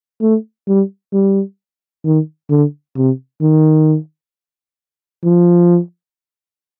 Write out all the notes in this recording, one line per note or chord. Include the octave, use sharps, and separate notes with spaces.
A3
G3
G3
D#3
D3
C3
D#3
F3